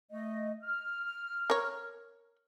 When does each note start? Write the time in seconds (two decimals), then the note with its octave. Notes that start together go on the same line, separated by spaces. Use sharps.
0.11 A3 D#5
0.63 F6
1.50 A#4 C#5